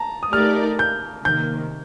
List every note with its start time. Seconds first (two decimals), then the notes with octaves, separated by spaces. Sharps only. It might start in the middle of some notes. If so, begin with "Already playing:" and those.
Already playing: A5 A#5
0.23 D#6
0.32 A3 D#4 G4 A#4 D5 F6
0.79 G6
1.25 C3 D#3 A#3 G6